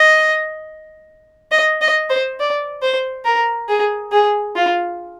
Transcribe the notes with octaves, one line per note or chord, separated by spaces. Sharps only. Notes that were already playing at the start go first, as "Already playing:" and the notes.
Already playing: D#5
D#5
D#5
C5
D5
C5
A#4
G#4
G#4
F4